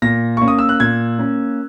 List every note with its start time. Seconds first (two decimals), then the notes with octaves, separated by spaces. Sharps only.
0.02 A#2 A#6
0.37 A#3 C#4 C#6
0.48 D#6
0.58 E6
0.69 F#6
0.80 A#2 G#6
1.19 A#3 C#4